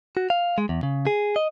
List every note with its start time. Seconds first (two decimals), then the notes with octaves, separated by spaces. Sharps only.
0.17 F#4
0.30 F5
0.58 G#3
0.69 E2
0.83 C#3
1.07 G#4
1.36 D#5